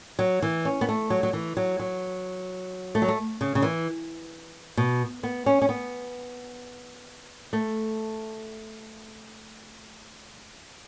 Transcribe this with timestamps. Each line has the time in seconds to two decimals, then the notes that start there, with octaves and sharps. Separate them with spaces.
0.19 F#3
0.42 E3
0.65 C#4
0.81 B3
0.89 A3
1.10 F#3
1.23 F#3
1.33 E3
1.57 F#3
1.79 F#3
2.95 A3
3.02 F#3
3.08 A3
3.41 C#3
3.55 C#3
3.62 E3
4.77 B2
5.23 B3
5.46 C#4
5.62 C#4
5.69 B3
7.53 A3